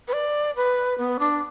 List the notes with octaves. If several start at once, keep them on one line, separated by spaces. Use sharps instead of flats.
B4
D5
B4
B3
D4